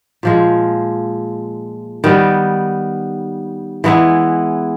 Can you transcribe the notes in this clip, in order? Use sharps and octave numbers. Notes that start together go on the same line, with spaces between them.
A#2 F3 G#3
D#3 G3 B3
E3 G#3 B3 E4